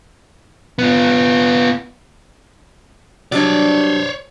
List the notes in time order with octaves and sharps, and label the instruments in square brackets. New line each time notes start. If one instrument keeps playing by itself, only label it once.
[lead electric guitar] B3 F4
[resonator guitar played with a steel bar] F#3 G3 D4 [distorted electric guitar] C#5 D5